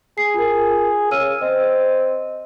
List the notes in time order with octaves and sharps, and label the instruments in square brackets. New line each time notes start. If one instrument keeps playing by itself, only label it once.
[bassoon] G#4 [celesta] C7
[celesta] F4 A#4
[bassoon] C#3 [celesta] E6 F6 D#7
[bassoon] C4 [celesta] D#5